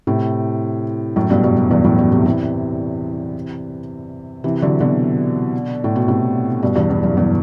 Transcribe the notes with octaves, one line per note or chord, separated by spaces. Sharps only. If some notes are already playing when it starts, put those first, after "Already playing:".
A2 C3
F#2 A2
G2 B2
G2 B2
F#2
E2 G2
F#2 A2
G2 B2
A2 C3
C3 E3
C3 E3
D3 F#3
B2 D3
A2
B2
A2 C3
G2 B2
E2 G2
E2
F#2
E2 G2